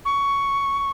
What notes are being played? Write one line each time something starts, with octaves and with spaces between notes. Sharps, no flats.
C#6